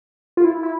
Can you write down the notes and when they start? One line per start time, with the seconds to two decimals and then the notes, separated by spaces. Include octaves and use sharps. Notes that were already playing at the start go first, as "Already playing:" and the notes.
0.37 F4
0.44 E4
0.63 E4